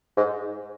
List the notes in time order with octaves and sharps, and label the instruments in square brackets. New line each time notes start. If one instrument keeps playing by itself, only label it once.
[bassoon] G#2